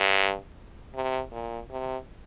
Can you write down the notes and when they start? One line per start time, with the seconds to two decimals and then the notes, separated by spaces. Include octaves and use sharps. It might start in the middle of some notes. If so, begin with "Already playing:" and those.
Already playing: G2
0.95 C3
1.33 A#2
1.71 C3